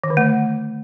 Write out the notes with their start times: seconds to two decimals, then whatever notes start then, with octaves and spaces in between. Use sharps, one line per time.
0.04 D#3
0.10 D3
0.17 A3